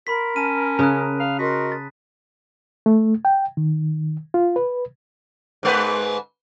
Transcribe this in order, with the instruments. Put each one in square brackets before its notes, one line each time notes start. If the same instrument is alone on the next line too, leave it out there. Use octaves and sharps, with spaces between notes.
[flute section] A#4 [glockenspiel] B5 C6 B6
[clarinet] C#4 [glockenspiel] A5 D#7
[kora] C#3 [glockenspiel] A#5 D#6 F#6
[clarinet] F5
[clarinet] F#4 [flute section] A#4 D#5 C6 [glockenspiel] B6
[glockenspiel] A6
[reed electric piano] A3
G5
D#3
F4
B4
[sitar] G#2 G#3 B4